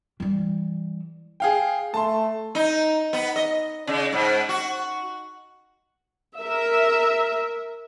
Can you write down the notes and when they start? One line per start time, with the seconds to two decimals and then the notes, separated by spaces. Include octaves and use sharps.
0.20 E3 G3
1.40 G#4 F5 G5
1.94 A3 A5 C6
2.55 D#4
3.13 B3
3.36 D#5
3.87 C#3
4.12 G#2
4.49 F#4
6.38 A#4 E5